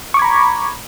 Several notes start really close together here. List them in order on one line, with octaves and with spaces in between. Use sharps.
C#6 D6 G#6 B5 A#5